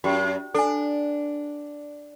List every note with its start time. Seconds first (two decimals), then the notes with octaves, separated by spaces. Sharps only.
0.04 F#2 F#4 G4
0.54 D4 A4 G#5